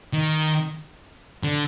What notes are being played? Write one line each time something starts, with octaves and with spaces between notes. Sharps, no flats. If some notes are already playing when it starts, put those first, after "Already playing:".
D#3
D3